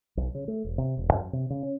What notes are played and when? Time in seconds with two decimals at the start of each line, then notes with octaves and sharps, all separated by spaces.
0.17 B1
0.35 C#3
0.48 A3
0.64 E1
0.78 C3
0.97 E1
1.13 F#2
1.33 C3
1.50 C#3
1.63 C#4